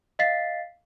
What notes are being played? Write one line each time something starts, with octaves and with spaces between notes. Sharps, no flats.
D#5 F5 A6 B6 C7